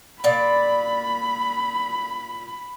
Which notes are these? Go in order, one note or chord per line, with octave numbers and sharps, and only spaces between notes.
A#2 D5 B5